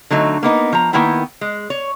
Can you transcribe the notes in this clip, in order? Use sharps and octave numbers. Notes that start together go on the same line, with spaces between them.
D3 F#3 A3 D#4
A#3 B3 D#4
F3 A#5
D#3 A#3 B3 E4 G5
G#3
C#5